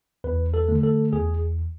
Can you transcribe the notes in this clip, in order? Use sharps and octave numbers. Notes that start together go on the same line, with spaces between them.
E2 B4
A4
D3 A3
A4
E2 G#4